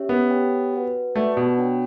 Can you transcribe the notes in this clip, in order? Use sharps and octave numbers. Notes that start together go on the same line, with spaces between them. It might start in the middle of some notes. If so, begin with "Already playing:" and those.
Already playing: C#4 G4 C#5 E5
B3
G4 C#5 G5
F#4 B4 F#5
A3 F#4 B4 D5 F#5 A5
B2
D4 F#4 C#5 G5